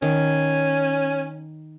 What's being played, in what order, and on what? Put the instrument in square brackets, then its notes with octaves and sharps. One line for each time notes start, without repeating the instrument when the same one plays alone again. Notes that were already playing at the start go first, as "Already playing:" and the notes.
[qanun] D#3 [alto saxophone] C#4